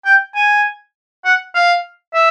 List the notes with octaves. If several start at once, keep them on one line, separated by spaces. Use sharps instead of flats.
G5
G#5
F#5
F5
E5